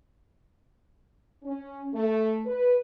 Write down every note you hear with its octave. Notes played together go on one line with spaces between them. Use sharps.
C#4
A3
B4